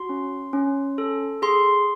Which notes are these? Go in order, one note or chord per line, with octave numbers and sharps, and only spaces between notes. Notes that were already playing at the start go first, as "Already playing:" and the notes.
Already playing: F#4 C6
C#4
C#4
A4
G#4 C6